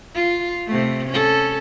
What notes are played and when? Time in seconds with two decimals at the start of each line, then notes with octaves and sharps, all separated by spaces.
0.15 F4
0.67 C3 A3
1.10 C#4 A4